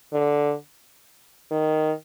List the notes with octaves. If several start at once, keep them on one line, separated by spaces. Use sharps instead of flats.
D3
D#3